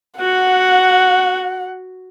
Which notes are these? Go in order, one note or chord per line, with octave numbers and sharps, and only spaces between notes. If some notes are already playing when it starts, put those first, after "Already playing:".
F#4 F#5